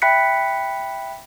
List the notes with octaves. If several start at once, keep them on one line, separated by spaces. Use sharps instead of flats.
E5 G5 B5 F#6 B6 C#7